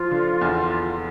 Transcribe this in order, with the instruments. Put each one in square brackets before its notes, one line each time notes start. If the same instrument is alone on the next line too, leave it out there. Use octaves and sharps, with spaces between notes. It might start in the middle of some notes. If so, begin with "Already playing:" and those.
Already playing: [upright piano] F3 [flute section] F4
[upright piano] D3
E2
E2